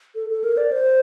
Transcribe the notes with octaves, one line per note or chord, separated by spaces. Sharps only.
A4
A4
A#4
D5
C5